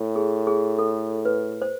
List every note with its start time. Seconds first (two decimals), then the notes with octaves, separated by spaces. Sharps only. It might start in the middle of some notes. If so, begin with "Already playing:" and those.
Already playing: A2
0.16 G#4
0.47 G#4
0.79 A4
1.25 B4
1.62 C5